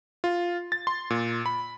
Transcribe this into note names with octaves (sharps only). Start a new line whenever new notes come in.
F4
A6
C6
A#2
B5